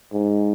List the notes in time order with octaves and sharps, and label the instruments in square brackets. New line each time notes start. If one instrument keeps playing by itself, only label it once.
[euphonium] G#2